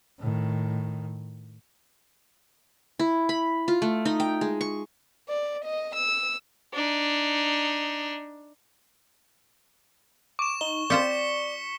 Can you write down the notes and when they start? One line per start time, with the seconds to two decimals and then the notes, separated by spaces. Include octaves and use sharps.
0.19 A2 D#3
2.99 E4
3.29 B5
3.68 F4
3.82 A3
4.05 D#4
4.20 G5
4.41 G#3
4.61 C#6
5.29 D5
5.64 D#5
5.95 E6
6.73 D4 D#4
10.39 C#6 D6 E7
10.61 D#4 G7
10.90 C4 F4 C5 D5 B6 C#7 G7